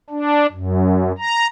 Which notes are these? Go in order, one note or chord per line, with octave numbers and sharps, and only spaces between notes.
D4
F#2
A#5